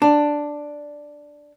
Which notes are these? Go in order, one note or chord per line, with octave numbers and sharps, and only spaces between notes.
D4